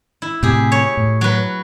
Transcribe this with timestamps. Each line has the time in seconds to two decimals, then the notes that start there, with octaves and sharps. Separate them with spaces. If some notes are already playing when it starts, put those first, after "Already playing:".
0.22 E4
0.43 A2 C3 G4 G#4
0.72 C#5
0.97 A2
1.21 F#3 B4